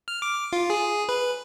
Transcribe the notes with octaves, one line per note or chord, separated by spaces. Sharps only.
F6
D6
F4
G#4
B4